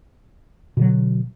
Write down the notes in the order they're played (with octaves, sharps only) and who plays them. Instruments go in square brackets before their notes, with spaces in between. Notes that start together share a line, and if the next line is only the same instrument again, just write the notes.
[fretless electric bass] B2 D3 F#3